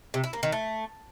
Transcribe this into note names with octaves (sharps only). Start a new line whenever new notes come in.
C3
E4
A#3
D#3
A3